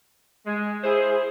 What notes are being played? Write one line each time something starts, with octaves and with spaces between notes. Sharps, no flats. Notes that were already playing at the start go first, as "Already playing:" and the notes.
G#3
E4 G#4 C5